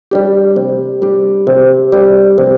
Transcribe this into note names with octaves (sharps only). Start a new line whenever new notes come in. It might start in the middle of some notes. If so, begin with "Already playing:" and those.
G3 D4 G4
C3
G3 D4 G4
C3
G3 D4 G4
C3